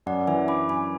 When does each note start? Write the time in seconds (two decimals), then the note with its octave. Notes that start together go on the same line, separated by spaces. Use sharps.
0.06 F#2 D5 F#5
0.27 E3 E5 G#5
0.48 D4 B5 D6
0.69 F#2 G#5 B5